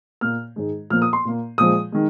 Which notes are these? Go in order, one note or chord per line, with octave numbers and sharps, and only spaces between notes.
A#2 A#3 F6
G#2 D#3 G#3
A#2 F3 A#3 F6
D#6
C6
A#2 A#3
A#2 F3 G#3 D#6
D#3 G#3